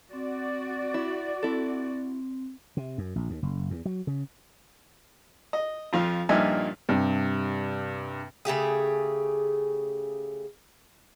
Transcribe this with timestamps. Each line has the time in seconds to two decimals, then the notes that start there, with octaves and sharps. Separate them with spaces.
0.13 C4 F#4 D5
0.94 E4
1.43 C4 E4 A4
2.77 C3
2.98 F#2
3.16 A#1
3.30 D#2
3.43 F#1
3.70 E2
3.86 F#3
4.07 C#3
5.53 D#5
5.93 F2 F3 F4
6.29 G2 A#2 F3 D#4 E5 G#5
6.89 G2 C3
8.45 C#3 A3 G4 G#4